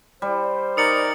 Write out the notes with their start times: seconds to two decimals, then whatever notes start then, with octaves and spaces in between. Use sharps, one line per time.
0.22 G3 C5
0.77 D#4 A#4 D5 D#6 C#7 F#7